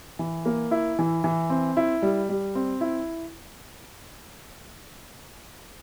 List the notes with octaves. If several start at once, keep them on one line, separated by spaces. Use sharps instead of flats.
E3
A#3
E4
E3
E3
C4
E4
G3
G3
C4
E4